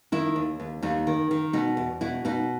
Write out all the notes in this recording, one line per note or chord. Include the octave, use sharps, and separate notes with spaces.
D#3 E4
D#2
D#2
D#2 D#4
D#3
D#3
B2 D#4
E2
B2 E4
B2 D#4